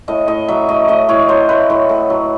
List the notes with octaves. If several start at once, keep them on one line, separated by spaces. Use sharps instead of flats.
A2 D#5
A2 D#5
F#3 E5
A3 D#5
A2 D#5
A2 C#5
F#3 C5
A3 B4
A2
A2
F#3